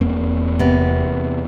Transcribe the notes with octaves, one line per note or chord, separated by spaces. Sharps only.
E1 E2 A#3 C4
C3 B3